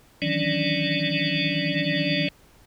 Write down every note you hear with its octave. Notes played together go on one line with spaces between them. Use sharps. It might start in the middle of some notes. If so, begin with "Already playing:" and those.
D#3 E3 F#3 C#4 D4 D5